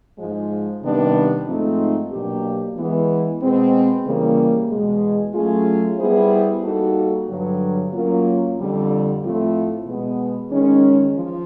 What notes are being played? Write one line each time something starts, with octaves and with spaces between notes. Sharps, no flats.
G#2 F3 G#3
C3 D#3 G3 B3 D4
G#2 F3 A3 C4 D#4
B2 F#3 A#3 D4 G4
E3 G#3 B3
B2 G#3 C4
C#3 E3 G3 A#3
E2 B2 G#3
F#3 A3 C#4 F4 G#4
G3 B3 E4 G#4 C5
G3 A#3 D#4 F#4 A4
G2 D3 F#3
F#3 A#3 C#4 F4 A#4
F2 D3 G3
A2 F3 A3 C4 F4
B2 G#3 B3
D#3 G#3 C#4
F3